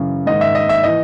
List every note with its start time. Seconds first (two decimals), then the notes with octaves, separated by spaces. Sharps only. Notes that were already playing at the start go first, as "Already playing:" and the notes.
Already playing: F#2 C#3 E3
0.26 G#2 D#3 D#5
0.41 E5
0.55 D#5
0.69 E5
0.84 E3 D#5